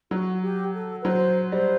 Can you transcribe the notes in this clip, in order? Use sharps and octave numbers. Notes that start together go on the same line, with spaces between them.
F#3 F#4
G4
A4
B4
F#3 C5
G3 C5